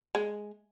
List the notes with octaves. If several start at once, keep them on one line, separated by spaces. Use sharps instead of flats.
G#3